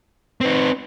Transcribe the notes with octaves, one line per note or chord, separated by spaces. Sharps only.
C4 D#4 B4